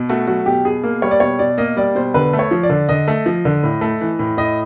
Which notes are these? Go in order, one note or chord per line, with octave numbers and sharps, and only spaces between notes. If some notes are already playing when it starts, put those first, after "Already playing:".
Already playing: B2
A3 F#4
F#3 F#4
B2 G4
B2 G#4
A#3
G3 C#5
D5
B2 C#5
B2 D5
A#3 D#5
G3 D5
B2 C5
D3 B4
A3
C#5
F3
D5
D3
D3 D#5
A3
F3
D3
A2
A3
E3
A2
A2 D#5